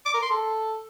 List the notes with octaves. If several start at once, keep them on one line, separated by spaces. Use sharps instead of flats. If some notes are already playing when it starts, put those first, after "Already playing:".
D6
A#4
C6
A4